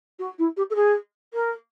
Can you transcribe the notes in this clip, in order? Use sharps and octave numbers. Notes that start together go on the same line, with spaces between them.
F#4
E4
G4
A4
G#4
A#4